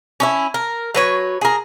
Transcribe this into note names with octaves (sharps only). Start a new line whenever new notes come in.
C#4 D#4 E4
A#4
F#3 B4 C#5
G#4 A#4